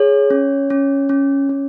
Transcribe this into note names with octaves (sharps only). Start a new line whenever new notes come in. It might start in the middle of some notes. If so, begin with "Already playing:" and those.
Already playing: G#4 C#5
C#4
C#4
C#4
C#4